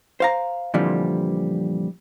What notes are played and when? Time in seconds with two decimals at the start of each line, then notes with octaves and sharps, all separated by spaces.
0.20 C5 F5 A#5
0.74 F2 A#2 D3 E3 F3 G3